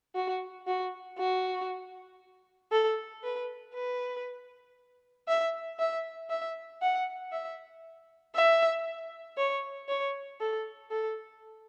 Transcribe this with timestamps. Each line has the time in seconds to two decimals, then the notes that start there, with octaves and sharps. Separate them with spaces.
0.15 F#4
0.67 F#4
1.18 F#4
2.72 A4
3.23 B4
3.74 B4
5.28 E5
5.79 E5
6.30 E5
6.82 F#5
7.32 E5
8.35 E5
9.37 C#5
9.88 C#5
10.40 A4
10.91 A4